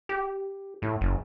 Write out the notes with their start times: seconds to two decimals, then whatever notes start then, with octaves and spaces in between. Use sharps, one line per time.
0.09 G4
0.82 A2
1.01 F#1